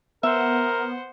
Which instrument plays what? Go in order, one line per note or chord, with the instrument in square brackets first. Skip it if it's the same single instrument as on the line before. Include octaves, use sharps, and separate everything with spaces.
[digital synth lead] B3 [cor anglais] A#4 [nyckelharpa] C5 F#5 [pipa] E5